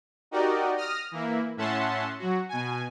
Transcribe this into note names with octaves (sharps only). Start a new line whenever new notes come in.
D#4 F#4 G4 A#4 D5 D#5
D#6 F6 A#6
E3 A#3 E4
A2 C#4 E5 F#5 A5 C6
F#3 F#4
B2 G#5